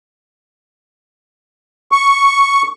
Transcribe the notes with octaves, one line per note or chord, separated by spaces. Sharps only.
C#6